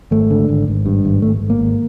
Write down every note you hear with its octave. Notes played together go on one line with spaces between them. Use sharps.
G#1 A3
D3
G#1
G#1
G2
G#1
G#1 A3
G#1
A#3
G#1